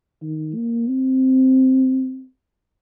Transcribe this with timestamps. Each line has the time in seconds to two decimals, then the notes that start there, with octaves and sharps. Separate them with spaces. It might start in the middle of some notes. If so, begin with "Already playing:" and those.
0.22 D#3
0.56 A#3
0.89 C4